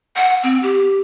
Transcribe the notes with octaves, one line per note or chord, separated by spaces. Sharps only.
F#5
C4
G4